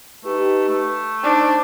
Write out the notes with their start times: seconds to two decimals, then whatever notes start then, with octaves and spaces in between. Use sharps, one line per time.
0.25 A3 D#4 G4 B4
0.68 A3
1.23 D4 D#4 C5 D6